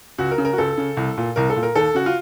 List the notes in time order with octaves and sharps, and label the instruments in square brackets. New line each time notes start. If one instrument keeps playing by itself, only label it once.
[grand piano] C#2 F#4
A#4
C#3
A#4
F#4
C#2 A4
C#3
C2
A#2
C2 A#4
A4
A#2
A#4
D#2 A4
C#3 F#4
F4